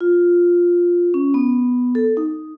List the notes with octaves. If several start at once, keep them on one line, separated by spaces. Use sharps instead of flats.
F4
C#4
B3
A4
D#4